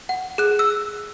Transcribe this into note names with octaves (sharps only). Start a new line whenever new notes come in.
F#5
G#4 F#6
E6